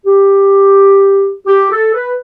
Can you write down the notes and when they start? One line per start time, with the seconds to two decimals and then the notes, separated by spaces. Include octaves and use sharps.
0.06 G4
1.47 G4
1.71 A4
1.94 B4